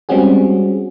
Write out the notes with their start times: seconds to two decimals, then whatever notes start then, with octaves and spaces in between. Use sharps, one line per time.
0.09 G3 G#3 C4 C#4 F#4 G#4